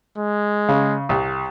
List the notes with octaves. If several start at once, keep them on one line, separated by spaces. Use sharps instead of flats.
G#3
C#3
C2